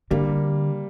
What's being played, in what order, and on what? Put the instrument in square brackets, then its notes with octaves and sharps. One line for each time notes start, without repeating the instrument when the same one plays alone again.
[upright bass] D3 [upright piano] G3 A#3